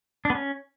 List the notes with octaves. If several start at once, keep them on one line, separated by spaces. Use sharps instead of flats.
D4
B3
C#4